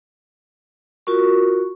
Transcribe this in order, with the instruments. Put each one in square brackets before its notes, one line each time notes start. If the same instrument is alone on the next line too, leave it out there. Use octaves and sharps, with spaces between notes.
[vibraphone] F4 F#4 A#4 C#6